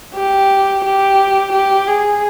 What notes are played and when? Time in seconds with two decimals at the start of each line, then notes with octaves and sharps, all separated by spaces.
0.16 G4
0.85 G4
1.53 G4
1.88 G#4